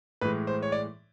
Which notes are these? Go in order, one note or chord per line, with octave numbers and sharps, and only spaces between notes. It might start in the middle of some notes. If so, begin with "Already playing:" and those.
A2 E3 G#3 B4
C5
C#5
D5